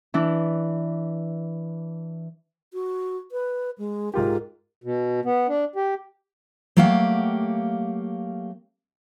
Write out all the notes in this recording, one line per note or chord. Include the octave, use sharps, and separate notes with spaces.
E3 D4 E4
F#4
B4
G#3
G#2 F4 G4 A#4
B2
B3
D4
G4
F#3 A3 A#3 G4 F5 F#5